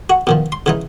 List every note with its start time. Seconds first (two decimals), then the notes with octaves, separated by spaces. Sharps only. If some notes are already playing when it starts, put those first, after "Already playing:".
0.10 F#4
0.27 B2 D#3 F3
0.52 C6
0.66 C#3 E3 D#4